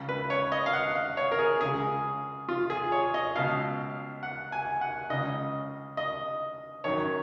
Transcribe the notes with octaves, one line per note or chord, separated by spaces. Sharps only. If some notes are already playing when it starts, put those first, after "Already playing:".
Already playing: C#2 C#3
B4
C#5
D#5
F5
F#5
F5
C#5
A#4
G#4
C#2 C#3 G#4
F4
G#4
C#5
D#5
C#2 B2 F5
F#5
G#5
F#5
C#2 C#3 D#5
D#5
F#2 D#3 C#5